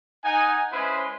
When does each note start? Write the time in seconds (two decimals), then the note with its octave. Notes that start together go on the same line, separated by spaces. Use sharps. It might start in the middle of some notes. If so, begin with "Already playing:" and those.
0.24 D#4 F#5 G#5
0.72 G#3 C#4 E4 B4 C5